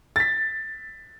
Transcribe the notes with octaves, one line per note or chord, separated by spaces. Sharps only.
A6 B6